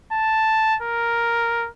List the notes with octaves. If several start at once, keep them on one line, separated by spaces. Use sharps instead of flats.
A5
A#4